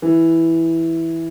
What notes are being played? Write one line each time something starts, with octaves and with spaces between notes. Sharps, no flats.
E3